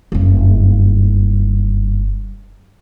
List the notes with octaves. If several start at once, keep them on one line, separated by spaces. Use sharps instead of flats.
F#1 G2